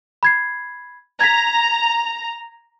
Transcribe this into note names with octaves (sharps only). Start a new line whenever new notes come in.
B5 G#6 C7
A#5 G#6 B6